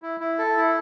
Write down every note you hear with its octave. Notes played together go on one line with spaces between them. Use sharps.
E4
E4
A4
E4